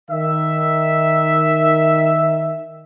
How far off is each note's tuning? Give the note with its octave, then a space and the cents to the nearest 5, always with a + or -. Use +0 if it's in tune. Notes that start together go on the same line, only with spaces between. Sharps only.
D#3 +0 E5 +0